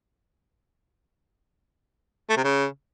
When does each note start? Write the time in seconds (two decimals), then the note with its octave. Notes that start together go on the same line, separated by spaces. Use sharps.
2.29 A3
2.37 C3
2.44 C#3